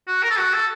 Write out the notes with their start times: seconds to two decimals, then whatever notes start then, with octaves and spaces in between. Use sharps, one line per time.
0.07 F#4
0.22 A#4
0.30 A4
0.38 F#4
0.53 A4